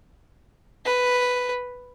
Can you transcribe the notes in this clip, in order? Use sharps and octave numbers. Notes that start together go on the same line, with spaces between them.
B4